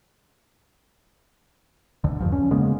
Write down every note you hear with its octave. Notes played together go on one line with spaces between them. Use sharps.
D2 D3
E2 G2 F3
C#4
C#3 G#3 A#3 B3